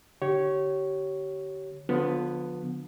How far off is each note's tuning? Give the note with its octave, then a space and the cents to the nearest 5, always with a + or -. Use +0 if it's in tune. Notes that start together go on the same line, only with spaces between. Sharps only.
D3 +0 G4 -30 C#5 +0
D3 +0 F3 +30 B3 +0